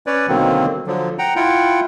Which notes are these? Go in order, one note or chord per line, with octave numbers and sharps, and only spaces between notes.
C#4 B4 C#5 D5
B2 D3 D#3 F#3 A#3 C4
D3 F3 F#3
F#5 G5 A#5
E4 F4 F#5 G5